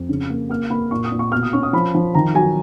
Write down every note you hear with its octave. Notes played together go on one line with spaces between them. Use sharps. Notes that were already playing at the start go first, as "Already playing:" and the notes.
Already playing: F2
C#3
A#3
A#3 F6
A#3 B5
A#2 C#6
D#6
A#2
C#6
B2 F6
D#6
C#4 C#6
D#6
F3 B5
F3
D#3 A#5
F#3 G#5